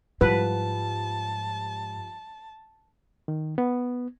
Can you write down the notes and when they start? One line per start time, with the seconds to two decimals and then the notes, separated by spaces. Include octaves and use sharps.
0.21 G#2 F3 G3 B4 A5
3.28 D#3
3.58 B3